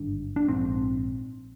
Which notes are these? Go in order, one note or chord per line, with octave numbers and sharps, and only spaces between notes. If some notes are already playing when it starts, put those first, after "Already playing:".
Already playing: G#1 G2 D3 D4
D4
A#1 G#2 C4